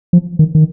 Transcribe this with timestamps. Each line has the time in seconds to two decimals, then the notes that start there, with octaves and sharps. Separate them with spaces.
0.13 F3
0.39 D#3
0.55 D#3